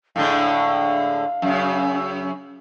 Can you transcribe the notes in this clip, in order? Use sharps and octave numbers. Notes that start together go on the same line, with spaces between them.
A2 D3 G#3 F5
F#2 C#3